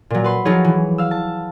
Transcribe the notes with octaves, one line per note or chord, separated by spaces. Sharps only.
A#2 F#3
B4 C6
F3 F#3 D#4 F4 G#4 C#5
E3
F5 E6
A5